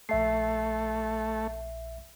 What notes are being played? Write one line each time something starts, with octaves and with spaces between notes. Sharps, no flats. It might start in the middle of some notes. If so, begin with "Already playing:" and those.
A#1 A3 E5 C7